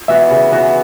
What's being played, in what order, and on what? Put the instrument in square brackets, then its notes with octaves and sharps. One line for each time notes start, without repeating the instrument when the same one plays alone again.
[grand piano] E3 B3 F#4 [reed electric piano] E5
[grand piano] C#3
E3 B3 F#4